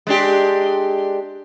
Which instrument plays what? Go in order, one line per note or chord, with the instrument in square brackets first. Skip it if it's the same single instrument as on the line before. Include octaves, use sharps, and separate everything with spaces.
[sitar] G#3 D4 G4